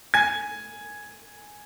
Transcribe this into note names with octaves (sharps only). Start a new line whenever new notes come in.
G#5 G#6